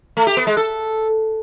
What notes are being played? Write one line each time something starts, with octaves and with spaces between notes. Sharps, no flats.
A3
G4
B3
G#3
A4